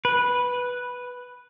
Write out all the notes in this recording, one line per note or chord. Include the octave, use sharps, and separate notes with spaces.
B4